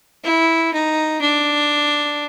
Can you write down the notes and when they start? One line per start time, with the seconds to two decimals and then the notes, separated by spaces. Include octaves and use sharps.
0.24 E4
0.73 D#4
1.21 D4